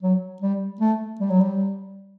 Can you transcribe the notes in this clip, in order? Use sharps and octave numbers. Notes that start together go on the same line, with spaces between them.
F#3
G3
A3
G3
F#3
G3